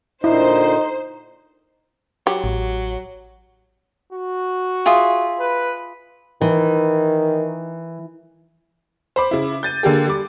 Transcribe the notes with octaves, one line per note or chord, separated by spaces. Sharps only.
A#2 D3 D#4 E4 C5
F#3 G4
A1
F#4
F4 G#4 E5
B4
D#3 E3
C5 B5 D6
C#3 E4
G6 A6 D#7
D3 A#3 G4 G#4
G3 D6